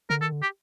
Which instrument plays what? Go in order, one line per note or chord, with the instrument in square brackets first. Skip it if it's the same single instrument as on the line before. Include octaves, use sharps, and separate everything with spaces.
[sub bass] D3 [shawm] A#4
[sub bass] D#3 [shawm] A4
[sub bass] D3
[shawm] G4